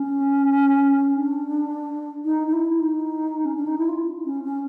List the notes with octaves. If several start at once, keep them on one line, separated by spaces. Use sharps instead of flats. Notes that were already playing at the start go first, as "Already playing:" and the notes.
Already playing: C#4
D4
D#4
D#4
E4
D#4
C#4
D4
D#4
E4
F4
C#4
C#4